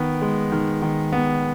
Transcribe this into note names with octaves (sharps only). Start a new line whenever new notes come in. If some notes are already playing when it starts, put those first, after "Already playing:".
Already playing: D#3 B3
G#3
D#3
D#3
B3